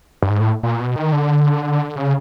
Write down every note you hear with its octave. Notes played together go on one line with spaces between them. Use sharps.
G2
G#2
A2
A#2
B2
D#3
D3
C#3